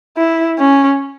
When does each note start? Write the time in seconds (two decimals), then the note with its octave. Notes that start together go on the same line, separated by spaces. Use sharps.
0.17 E4
0.59 C#4